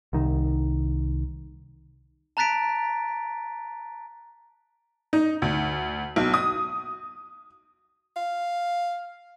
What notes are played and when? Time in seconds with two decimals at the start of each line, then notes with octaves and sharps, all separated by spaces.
0.13 C2 D#3
2.37 A5 A#5 F#6 A6 B6 D7
5.13 D#4
5.42 D2
6.16 B1
6.34 D#6
8.16 F5